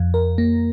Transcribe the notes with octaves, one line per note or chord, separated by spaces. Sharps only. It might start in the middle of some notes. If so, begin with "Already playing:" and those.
Already playing: F2
A#4
A#3